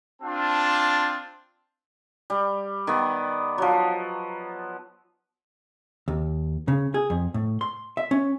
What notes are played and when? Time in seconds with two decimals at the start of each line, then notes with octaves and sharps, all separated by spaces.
0.22 C4 D4 F4 A5
2.30 G3
2.87 D#3 B3
3.58 F3 F#3
6.08 D#2
6.68 C#3
6.94 G#4
7.10 F2
7.34 A2
7.61 C6
7.97 E5
8.11 C#4